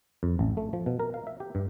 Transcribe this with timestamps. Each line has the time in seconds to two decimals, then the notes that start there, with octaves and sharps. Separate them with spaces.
0.23 F2
0.39 A1
0.57 A3
0.73 F3
0.86 B2
0.99 A#4
1.14 F5
1.27 E5
1.40 G4
1.55 G2